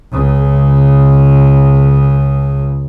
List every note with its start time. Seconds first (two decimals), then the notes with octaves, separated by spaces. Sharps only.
0.14 C#2 C#3